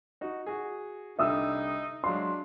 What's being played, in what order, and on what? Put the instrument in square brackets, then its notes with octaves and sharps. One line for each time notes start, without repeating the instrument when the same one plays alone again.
[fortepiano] D#4 F#4
F#4 G#4
[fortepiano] C2 D3 [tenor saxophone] D#4 [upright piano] E5 D#6 E6
[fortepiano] F#3 G#3 F5 [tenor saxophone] D4 [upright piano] C6